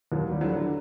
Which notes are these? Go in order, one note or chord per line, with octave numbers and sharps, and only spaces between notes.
D#2 F#3
G3
F#3
D3
F#3